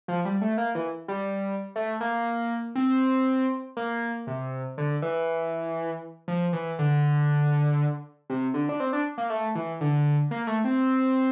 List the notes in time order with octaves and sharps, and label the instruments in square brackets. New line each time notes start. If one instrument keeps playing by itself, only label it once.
[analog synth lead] F3
G3
A3
A#3
E3
G3
A3
A#3
C4
A#3
C3
D3
E3
F3
E3
D3
C3
D3
D4
C4
D4
A#3
A3
E3
D3
A#3
A3
C4